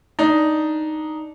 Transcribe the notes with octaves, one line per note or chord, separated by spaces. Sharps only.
D4 D#4